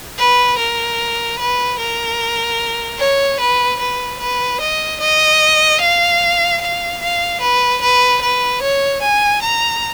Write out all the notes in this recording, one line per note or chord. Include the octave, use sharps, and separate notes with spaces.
B4
A#4
B4
A#4
C#5
B4
B4
B4
D#5
D#5
F5
F5
F5
B4
B4
B4
C#5
G#5
A#5